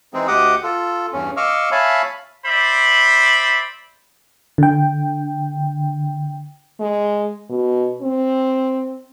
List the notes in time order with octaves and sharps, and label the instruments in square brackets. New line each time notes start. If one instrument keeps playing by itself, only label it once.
[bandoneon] E3 G#3 C4 D#4 G#4
D2 G4 D#5 F#5 D6 D#6
F4 A4
E2 G2 C#4
D#5 F5 C#6 D6 E6 F6
C#5 E5 F5 G#5 A5 B5
[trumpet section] C5 D5 E5 B5
[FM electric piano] D3 G5
[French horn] G#3
B2
C4